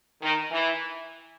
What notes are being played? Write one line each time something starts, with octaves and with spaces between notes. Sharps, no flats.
D#3
E3